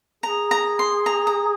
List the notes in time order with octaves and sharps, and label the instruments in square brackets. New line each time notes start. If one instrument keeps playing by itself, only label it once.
[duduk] G#4 [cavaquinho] A#5
[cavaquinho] A#5
C6
A#5
A#5